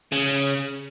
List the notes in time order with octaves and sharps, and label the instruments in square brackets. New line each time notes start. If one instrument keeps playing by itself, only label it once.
[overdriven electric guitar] C#3